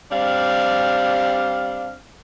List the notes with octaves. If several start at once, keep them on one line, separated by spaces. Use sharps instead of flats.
G3 C4 D4 F5